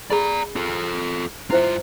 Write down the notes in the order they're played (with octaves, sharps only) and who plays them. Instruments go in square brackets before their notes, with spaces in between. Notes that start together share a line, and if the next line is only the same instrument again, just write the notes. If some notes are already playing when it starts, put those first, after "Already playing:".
[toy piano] G#4 B5 [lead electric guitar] D5 A#5
[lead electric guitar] F4 A4
[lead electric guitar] G2 F4 [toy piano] E4 C5 E5